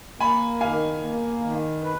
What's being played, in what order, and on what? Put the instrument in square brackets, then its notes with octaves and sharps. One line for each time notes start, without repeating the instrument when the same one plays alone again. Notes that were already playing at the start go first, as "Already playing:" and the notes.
[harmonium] A#3 [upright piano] G#5 B5
[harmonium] D#3 [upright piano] F5 G#5
[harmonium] A#3
D#3
B4